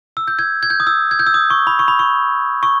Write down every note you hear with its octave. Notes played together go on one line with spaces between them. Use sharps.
E6
G6
G#6
G#6
G6
D#6
E6
G#6
G6
E6
D#6
C#6
B5
C#6
B5
C#6
C#6